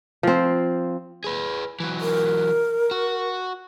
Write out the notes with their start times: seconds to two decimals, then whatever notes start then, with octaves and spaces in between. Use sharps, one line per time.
0.23 F3 C4
1.24 G#4 B4
1.80 E3 F#3
2.01 A#4
2.91 F#4